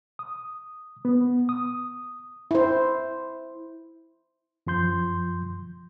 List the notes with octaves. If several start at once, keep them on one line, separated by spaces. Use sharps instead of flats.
D#6
B3
D#6
E4 C5
F#2 F3 C6 G6